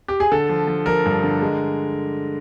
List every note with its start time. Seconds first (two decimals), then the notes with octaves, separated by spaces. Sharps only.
0.08 G4
0.20 G#4
0.32 D3 A4
0.49 F3
0.67 F3
0.86 F3 A#4
1.05 G2
1.24 D3
1.42 G#3